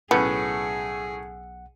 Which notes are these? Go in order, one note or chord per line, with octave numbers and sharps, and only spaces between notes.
B1 A2 B3 C#4 G#4 F#5 C#7